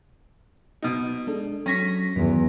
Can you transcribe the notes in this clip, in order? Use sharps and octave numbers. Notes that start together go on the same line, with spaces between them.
B2 D#4
G#3 D4 A4
F#3 C#4 C#6 A#6 B6
E2 G2 D#3 F#3